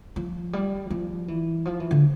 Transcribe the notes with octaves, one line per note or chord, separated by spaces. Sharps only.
F3
G3
F3
E3
F3
E3
D3